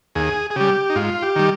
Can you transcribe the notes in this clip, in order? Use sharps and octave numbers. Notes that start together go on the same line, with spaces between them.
D#2 G#4
G#4
C#3 G3 G4
D#4
G#2 F4
G4
D#3 G3